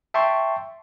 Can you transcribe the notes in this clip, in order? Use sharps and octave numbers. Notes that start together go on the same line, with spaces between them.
E5 G5 A5 C6 C#6